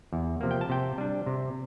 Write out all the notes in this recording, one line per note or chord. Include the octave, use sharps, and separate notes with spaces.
E2
C3 F3 A#3
G5
A5
C3 G5
G3 D4
C3